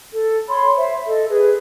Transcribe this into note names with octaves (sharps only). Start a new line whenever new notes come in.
A4
C#5 B5 C6
C5 E5
A4 D#5
G#4 B4